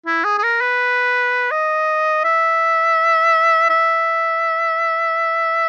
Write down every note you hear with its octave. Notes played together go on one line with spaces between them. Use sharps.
E4
G#4
G#4
A#4
B4
D#5
E5
E5